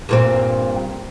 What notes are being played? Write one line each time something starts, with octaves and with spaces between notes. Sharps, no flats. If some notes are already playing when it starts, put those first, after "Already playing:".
G2 A#2 C4